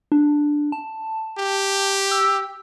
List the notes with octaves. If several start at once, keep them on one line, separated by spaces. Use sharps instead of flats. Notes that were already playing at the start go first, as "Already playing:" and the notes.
D4
A5
G4
E6